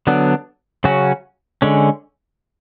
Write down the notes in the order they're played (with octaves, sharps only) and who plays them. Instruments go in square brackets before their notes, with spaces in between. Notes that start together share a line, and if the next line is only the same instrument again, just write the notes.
[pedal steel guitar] D3 F#3 B3 D4
C#3 F#3 C#4 F#4
D3 G#3 C#4